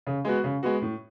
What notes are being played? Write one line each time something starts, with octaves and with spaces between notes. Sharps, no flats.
C#3
G#3 B3 F#4
C#3
G#3 B3 F#4
A2